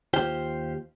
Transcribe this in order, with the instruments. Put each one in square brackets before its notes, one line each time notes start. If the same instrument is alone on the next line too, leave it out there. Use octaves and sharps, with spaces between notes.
[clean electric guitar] D#2 F4 G4 C5 G5